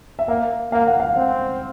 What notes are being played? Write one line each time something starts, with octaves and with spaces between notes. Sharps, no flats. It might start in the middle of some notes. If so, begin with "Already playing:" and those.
E5
A#3 F5
A#3 F5
F#5
F5
C4 F#5